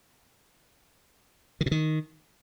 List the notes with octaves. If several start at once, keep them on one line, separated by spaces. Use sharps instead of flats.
D#3
B2
D#3